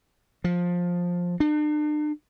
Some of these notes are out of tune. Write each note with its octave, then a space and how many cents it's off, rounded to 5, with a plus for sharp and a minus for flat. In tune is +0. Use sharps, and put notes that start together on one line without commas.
F3 +15
D4 +40